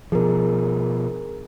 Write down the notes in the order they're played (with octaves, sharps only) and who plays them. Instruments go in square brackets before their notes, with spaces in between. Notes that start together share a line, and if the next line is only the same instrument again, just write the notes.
[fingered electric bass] B2 F3 [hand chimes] G#4 A#4